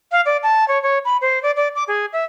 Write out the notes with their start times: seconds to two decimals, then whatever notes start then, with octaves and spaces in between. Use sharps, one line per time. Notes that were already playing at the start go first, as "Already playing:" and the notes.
0.12 F5
0.26 D5
0.43 A5
0.68 C#5
0.83 C#5
1.05 B5
1.21 C5
1.43 D5
1.56 D5
1.75 D6
1.88 G#4
2.13 E5